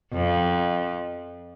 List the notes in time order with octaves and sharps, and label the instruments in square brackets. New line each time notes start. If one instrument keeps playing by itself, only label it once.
[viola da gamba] F2